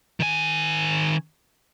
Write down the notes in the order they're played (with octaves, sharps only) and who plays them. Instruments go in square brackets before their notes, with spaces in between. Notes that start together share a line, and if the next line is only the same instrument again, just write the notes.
[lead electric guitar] D#3 G#5